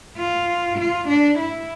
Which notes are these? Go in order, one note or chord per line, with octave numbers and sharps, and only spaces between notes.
F4
F4
D4
E4